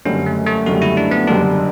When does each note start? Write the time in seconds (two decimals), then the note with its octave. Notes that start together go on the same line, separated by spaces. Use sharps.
0.05 F#1 F#2 D3 G3 C#4
0.26 A3
0.46 A3
0.66 F#1 F#2 D3 G3 F#4
0.82 E4
0.97 D4
1.11 B3
1.27 F#1 F#2 D3 G3 D4